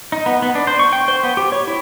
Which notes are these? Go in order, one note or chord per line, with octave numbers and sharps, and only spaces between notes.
D#4
B3
B3
D4
C5
C#6
G5
C5
B3
G4
C#5
E4